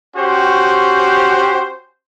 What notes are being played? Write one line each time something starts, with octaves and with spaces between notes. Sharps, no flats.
C#4 F#4 G4 C5